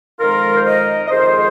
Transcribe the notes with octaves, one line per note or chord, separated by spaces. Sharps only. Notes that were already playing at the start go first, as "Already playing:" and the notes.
F2 D#3 G#3 F4 A#4
C5
A#4 D#5
D#5
F2 D#3 G#3 G#4 C5